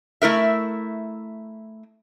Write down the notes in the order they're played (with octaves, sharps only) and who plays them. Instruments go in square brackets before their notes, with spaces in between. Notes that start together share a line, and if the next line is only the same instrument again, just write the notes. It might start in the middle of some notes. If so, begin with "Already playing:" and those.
[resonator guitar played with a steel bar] A3 E4 A#4 E5